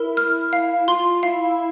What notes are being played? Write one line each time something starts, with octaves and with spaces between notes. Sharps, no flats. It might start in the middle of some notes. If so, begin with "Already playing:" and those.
Already playing: E4 A#4
F6
F5
F4 C6
E4 F5